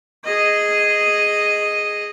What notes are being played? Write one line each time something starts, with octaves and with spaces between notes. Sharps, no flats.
G#4 D#5